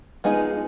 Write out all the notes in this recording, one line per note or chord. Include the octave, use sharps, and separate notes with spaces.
F3 G#3 B3 D#4 G#4